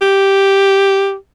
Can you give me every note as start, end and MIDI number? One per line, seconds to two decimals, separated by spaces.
0.02 1.15 67